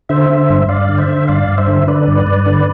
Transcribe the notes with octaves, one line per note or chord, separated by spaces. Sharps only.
D3 C5 E5
D3
G2
G2 D5 F5
D3
C5 E5
D3
G2 D5 F5
G2
C5 E5
D3
D3 B4 D5
G2
G2
D3